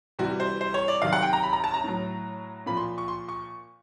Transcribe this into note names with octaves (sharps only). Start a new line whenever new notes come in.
C3 E3 G3 F#4
C5
C5
C#5
D5
C3 D#3 F#3 F5
F#5
G5
A#5
B5
A#5
A5
A#5
A2 F#3
A#2 F3 B5
C6
C#6
C6
C#6